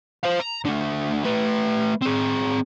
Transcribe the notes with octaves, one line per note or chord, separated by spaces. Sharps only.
C5 F5
A#5
D3 A3
A3 B4
C4 G#4